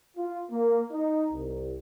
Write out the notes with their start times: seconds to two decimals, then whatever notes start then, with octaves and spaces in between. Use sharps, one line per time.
0.17 F4
0.50 A#3
0.92 D#4
1.32 C2